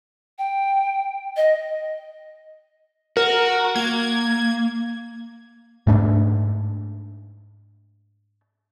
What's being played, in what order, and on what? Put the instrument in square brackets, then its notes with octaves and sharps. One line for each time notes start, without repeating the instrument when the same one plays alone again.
[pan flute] G5
D#5
[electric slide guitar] F#4 [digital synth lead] A#4
[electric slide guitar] A#3 [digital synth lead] G#6
[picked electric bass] G#2 A3 D4